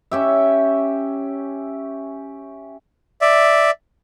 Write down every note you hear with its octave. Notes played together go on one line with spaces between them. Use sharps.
C#4 G4 E5
D5 E5